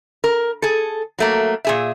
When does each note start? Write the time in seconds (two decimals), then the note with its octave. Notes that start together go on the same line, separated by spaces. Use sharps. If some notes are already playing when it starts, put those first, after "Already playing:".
0.24 A#4
0.62 G#4 A4
1.19 F#3 A3 A#3
1.65 A#2 G#4 E5